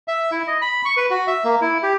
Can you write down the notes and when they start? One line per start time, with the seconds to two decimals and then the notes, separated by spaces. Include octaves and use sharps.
0.08 E5
0.31 E4
0.48 D#5
0.61 B5
0.85 C#6
0.97 B4
1.10 F#4
1.27 E5
1.44 A#3
1.61 E4
1.83 G4